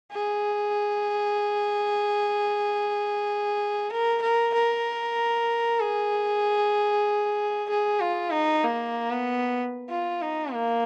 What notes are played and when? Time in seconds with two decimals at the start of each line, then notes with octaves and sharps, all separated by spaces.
0.12 G#4
3.91 A#4
4.22 A#4
4.54 A#4
5.80 G#4
7.69 G#4
8.00 F4
8.32 D#4
8.64 A#3
9.11 B3
9.90 F4
10.22 D#4
10.53 A#3